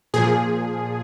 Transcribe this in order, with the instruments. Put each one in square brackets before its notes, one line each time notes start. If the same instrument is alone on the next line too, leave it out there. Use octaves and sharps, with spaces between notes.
[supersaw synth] A#2 F3 G#4